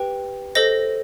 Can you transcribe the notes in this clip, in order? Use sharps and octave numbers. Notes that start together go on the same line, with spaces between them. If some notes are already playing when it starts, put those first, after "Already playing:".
Already playing: G4 B4 G5
A4 C5 D#5 A#6